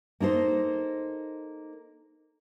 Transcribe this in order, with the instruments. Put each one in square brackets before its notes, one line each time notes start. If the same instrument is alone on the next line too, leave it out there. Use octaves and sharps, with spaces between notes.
[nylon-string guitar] A#3 D#4 A4 C5